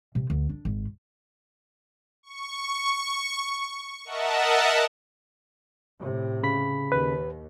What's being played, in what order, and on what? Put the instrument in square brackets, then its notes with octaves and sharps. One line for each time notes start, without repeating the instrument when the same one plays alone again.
[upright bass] C3
D2
D4
G#1
[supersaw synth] C#6
A#4 D#5 E5 F#5 A5
[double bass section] A2 C3
[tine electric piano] C#3 B5 B6
[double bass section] D#2 [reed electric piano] B4